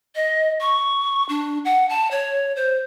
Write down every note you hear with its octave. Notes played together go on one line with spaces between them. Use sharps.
D#5
C#6
D4
F#5
A5
C#5
C5